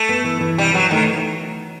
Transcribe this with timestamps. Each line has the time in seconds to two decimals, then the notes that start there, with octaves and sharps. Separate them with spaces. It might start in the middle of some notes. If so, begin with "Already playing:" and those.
Already playing: A3
0.09 B3
0.24 E3
0.41 E3
0.58 C3 G3
0.74 E3 F#3
0.91 D#3 A3